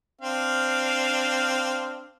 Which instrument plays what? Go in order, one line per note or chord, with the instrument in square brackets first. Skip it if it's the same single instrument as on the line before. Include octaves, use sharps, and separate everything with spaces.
[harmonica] C4 D4 F5